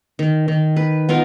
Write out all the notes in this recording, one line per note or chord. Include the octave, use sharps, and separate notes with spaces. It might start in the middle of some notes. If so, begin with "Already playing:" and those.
D#3
D#3
B4
B3 D#4 F4 A#4